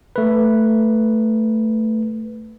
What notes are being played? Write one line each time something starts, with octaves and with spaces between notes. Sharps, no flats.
A3 B4